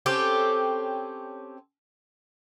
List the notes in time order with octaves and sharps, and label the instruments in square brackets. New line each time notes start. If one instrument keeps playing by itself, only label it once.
[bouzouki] C4 C#4 G4 A4